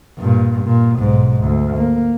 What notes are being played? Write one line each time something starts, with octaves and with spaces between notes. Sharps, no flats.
G2 A#2
A#2
B1 G#2
D2
A#3